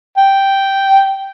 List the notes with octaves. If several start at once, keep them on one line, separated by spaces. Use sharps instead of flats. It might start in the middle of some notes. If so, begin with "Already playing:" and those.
G5